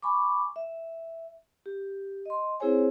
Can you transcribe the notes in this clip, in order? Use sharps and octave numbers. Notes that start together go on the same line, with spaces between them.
G#5 B5 C#6 D6
E5
G4
D#5 C6
C4 E4 G#4 C5 C#5 G#5